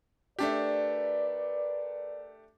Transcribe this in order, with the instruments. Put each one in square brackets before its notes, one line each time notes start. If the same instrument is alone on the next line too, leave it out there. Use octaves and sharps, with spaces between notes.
[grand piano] A3 D4 G4 [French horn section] A#4 B4 D5